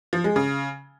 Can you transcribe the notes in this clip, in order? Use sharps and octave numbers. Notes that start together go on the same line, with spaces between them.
F3
G#3
C#3